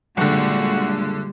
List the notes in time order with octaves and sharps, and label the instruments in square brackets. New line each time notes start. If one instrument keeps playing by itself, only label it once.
[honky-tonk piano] F#1 D3 [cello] A#2 G#3 [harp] G3 [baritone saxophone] F#4